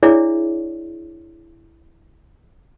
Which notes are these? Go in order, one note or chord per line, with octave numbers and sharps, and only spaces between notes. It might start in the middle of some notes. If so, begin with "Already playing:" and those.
D4 E4 G#4 C#5 D5 E5